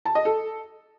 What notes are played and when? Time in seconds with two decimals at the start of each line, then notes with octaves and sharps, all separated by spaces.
0.05 A5
0.15 D#5
0.25 A4